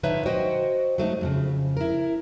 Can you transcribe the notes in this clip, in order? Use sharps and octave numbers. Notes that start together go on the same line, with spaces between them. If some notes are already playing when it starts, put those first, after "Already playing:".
D3 F3 D#4 B4 C#5 E5
F#4 C5 D#5 F#5 G5
F#3 A3 D#4
F2 A2 C#3
E4 A#4